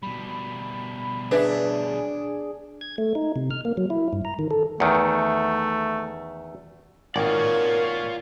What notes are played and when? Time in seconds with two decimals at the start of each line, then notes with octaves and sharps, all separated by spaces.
0.03 B2 G3 B5
1.31 D4 G#4 B4 C#5 E5
2.81 G#6
2.98 A3
3.15 D#4
3.36 C3
3.51 F6
3.65 A#3
3.77 F#3
3.90 E4
4.13 G2
4.25 A#5
4.39 D#3
4.51 A4
4.80 E2 D#3 A3
7.16 G#1 F4 A#4 C#5 D5 F5